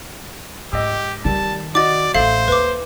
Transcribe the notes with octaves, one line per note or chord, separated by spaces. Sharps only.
G#2 G4 D#5 E6
D#3 G3 D#4 A5
F#4 D5 D#5 D6 A6
A1 A4 C5 E5 F5 C7
D#2 B4 D6